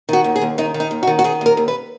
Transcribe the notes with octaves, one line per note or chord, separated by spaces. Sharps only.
D#3 F#4
D#2
G#4
D#2
D#3 D#4
D#3
D#4
D#2
F#4
D#3
F#4
D#3 G#4
D#2 A#4
D#2
B4